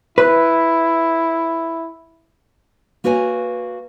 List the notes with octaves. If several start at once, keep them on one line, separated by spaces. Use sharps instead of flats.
E4 B4
A#3 F#4 B4 C#5 G#5